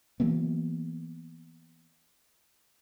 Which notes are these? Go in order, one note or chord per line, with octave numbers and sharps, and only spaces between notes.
E3 F#3 A#3 B3